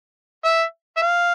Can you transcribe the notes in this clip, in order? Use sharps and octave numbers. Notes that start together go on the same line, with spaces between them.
E5
E5
F5